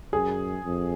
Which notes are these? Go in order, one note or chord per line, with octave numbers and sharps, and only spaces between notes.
F#2 G#4
F2